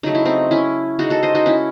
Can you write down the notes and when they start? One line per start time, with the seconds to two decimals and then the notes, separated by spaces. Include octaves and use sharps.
0.03 C#3 F#3 A3 D#4
0.15 E4
0.25 C4 D#4
0.51 C#4 E4
0.99 C#3 G#3 D#4 F#4
1.10 F#4 A4
1.23 C5 D#5
1.35 D#4 F#4
1.46 C#4 E4